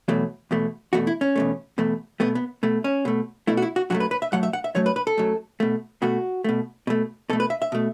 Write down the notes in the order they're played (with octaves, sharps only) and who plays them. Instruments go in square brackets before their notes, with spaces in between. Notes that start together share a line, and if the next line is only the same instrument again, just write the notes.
[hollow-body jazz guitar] E2 B2 F#3 A3
E2 B2 A3
E2 B2 A3 F#4
E4
C#4
E2 B2 A3
E2 B2 A3
B2 A3 B3
B3
B2 A3
C#4
B2 A3
B2 A3 E4
F#4
E4
F#4
F#2 F#3 A3 F#4
B4
B4
E5
F#2 F#3 A3 F#5
E5
F#5
E5
F#2 F#3 A3 C#5
B4
B4
A4
F#2 F#3 A3
B2 A3
B2 A3 F#4
B2 A3
B2 A3
B2 A4
A3
B4
E5
E5
B2 A3